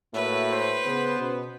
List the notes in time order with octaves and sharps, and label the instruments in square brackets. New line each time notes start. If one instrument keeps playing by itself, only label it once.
[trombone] A2 [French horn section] A#3 F#4 C#5 [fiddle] B4 [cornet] E5
[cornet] C5
[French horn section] C#3 G#4 [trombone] B3
[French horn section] B2 C#4